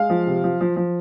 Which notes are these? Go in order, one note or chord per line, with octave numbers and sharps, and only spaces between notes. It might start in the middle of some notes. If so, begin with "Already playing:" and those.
Already playing: G#3 F5
F3
C3
F3
F3
F3